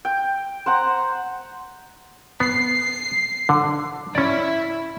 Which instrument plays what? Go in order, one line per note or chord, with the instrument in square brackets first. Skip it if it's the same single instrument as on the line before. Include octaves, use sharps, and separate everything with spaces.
[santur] G5
C5 F#5 A#5
[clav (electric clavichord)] B3 [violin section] C7
[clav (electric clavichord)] D3
[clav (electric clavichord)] C#4 D5 [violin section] E4